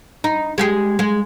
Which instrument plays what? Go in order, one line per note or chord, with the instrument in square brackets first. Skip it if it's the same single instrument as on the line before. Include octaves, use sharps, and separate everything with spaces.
[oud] D#4
G#3 G4 G#4
G#3